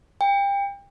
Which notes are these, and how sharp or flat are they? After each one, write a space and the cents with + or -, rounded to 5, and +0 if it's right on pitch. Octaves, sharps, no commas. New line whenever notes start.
G5 +30